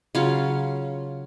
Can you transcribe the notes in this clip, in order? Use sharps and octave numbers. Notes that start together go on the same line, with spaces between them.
C#3 F#3 C#4 F4 F5